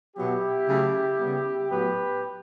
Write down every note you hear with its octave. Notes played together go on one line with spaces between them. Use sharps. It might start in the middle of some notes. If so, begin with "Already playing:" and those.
B2 F#3 B3 E4 G4
C#3 F#3 A3
C#3 G3 B3
A2 F#3 B3 G4 B4